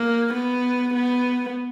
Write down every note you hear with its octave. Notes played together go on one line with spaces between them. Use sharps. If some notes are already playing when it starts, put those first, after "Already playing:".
Already playing: A#3
B3
B3